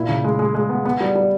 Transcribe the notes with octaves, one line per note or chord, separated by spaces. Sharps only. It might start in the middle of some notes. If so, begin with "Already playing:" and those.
Already playing: A#2 E4
C#3
G#3
G#3
G#3
B3
B3
G3
G3